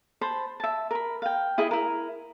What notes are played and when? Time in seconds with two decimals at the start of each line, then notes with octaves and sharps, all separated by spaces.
0.21 C5 A5 B5
0.60 E5 A5
0.91 A#4 B5
1.22 F5 G5
1.58 E4 G#4 D#5 B5
1.71 E4 A#4